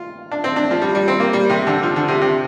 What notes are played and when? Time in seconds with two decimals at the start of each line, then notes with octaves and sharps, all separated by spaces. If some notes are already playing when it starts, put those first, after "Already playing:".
Already playing: F4
0.32 D4
0.44 C4
0.56 D4
0.71 F3
0.82 G3
0.95 G3
1.08 C4
1.20 A#3
1.33 G3
1.50 C3
1.67 D3
1.83 F3
1.96 D3
2.08 C3
2.21 C3